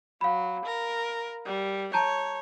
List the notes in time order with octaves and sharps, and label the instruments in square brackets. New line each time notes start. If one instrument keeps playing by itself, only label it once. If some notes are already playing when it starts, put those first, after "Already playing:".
[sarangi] F#3 [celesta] F5 B5
[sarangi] A#4
G3
[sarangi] C#5 [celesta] A5 A#5 G6